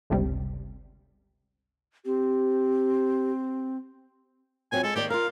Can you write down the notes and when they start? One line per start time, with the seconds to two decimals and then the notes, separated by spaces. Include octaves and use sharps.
0.10 G1 C#2 C3 G3
2.06 C4 G4
4.72 F#3 C4 F4 G#5
4.84 G#3 A4
4.96 D#3 A#3 G4 D5
5.10 F4 A#4 F5